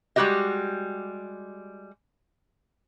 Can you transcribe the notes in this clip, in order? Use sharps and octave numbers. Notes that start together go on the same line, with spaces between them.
G3 G#3 D#4 F#4 G4 D#5